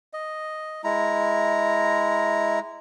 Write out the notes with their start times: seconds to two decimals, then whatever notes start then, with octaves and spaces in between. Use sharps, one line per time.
0.13 D#5
0.84 G#3 E4 A#5